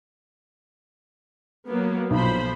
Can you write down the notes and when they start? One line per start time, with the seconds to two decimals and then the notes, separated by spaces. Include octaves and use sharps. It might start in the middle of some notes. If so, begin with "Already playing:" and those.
1.66 F#3 A#3 B3
2.10 B1 F3 C5 B5